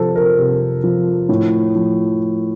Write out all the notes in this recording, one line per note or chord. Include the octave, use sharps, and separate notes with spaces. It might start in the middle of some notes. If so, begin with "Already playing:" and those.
Already playing: C3 F3 A4 C5
A#4
C3
F3
A2
F3